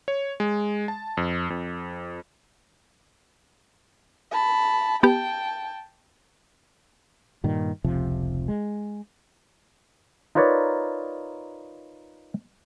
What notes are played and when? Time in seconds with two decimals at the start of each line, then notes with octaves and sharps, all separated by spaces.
0.08 C#5
0.40 G#3
0.88 A5
1.17 F2
1.50 F2
4.31 A5 B5
5.03 B3 G4 G5 A5
7.44 G2 A#2 D#3
7.84 F1 C#2 C3 F3
8.48 G#3
10.35 D#4 F4 A#4 B4 C#5 D5